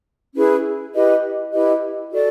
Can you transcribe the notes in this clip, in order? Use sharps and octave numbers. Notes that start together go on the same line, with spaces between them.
C#4 E4 G#4 B4
E4 G4 B4 D#5
E4 G4 B4 D#5
F#4 A4 D5